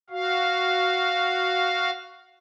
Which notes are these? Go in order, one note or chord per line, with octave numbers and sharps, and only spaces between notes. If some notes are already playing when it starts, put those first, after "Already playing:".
F#4 F5